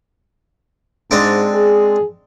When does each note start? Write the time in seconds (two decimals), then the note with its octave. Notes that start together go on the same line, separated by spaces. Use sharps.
1.11 G#2 G#3 C4 D4
1.55 G#4